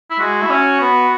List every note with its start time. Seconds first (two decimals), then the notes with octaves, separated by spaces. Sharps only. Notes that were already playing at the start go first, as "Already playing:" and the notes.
0.11 E4
0.20 G#3 F#4
0.43 E4
0.50 C#4
0.81 B3